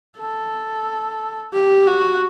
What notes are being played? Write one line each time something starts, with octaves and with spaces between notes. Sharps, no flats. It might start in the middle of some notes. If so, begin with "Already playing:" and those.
A4
G4
F#4